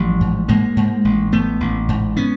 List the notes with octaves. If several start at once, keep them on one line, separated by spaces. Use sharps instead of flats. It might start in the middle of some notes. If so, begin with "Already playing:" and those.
Already playing: A1 F3 G3
G#2
G#2 G#3 A#3
G#2
A1
G#2 A3 B3
A1
G#2
B3 C#4